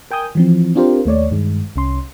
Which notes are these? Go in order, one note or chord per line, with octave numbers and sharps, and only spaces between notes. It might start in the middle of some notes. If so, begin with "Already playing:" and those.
A#4 G5 G#5 D#6 G6
E3 F3 C4
C4 D4 F4 G4 A#4 C5
D#2 A3 C#5 D5
G2 D#3 G#3
C2 C#4 C6